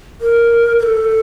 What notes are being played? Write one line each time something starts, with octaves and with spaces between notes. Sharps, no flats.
A#4
A#4
A4